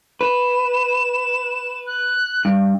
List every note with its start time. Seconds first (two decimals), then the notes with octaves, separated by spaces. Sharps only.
0.21 B4 E7
1.86 F#6
2.45 G2